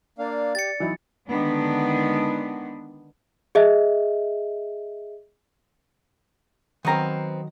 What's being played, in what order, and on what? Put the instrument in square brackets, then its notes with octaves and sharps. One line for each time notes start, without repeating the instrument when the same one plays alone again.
[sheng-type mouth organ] A#3 D4 F5 [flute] D5
[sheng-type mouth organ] G4 [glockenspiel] A6 C#7
[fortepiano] E3 F#3 D#4 [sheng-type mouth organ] E4
[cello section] D3 D#3 G#3 B3 D4
[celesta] G#4 D#5 E5
[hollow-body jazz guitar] D#3 F#3 A#5 [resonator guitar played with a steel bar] B3 C4 A#4